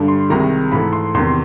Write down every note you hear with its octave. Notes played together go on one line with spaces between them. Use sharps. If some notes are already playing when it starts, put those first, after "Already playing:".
Already playing: G2 D3 G3
C6
C2 C3 D#3 G#3 A#5
G#2 E3 A3 B5
C6
E2 C3 D#3 C6